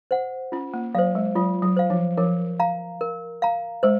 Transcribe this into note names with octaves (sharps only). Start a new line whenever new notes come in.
C5 F#5
C#4 F4
A#3
F#3 C5 F5
G#3
F#3 F4
F#3
C5 F5
F3
F3 A#4
F5 A#5
A#4
F5 A#5
G#3 C5